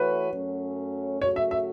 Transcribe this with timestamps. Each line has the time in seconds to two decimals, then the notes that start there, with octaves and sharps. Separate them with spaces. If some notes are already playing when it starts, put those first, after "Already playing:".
Already playing: E3 A3 F#4 B4 C#5
0.31 F#2 F#3 A3 C#4
1.21 F#2 C#3 A3 F#4 C#5
1.36 E5
1.51 E5